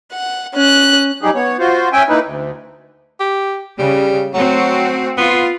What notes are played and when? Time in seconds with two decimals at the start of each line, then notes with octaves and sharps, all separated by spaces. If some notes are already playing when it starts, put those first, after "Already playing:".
0.12 F#5
0.55 C#4 F#6
1.22 F#3 G3 D#4 G4 G#4
1.35 B3 C#5
1.59 F4 F#4 C5
1.93 C#4 E5 G5 G#5
2.09 A#3 D#4 E4 B4
2.25 D2
3.20 G4
3.79 C#3 G3
4.34 F#3 A3 C4 F#4
5.18 B3 F4